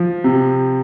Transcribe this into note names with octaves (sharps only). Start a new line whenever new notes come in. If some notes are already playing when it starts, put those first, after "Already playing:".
Already playing: F3
C3